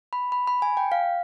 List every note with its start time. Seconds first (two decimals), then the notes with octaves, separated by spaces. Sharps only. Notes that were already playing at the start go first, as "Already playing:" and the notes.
0.13 B5
0.32 B5
0.47 B5
0.62 G#5
0.77 G5
0.92 F5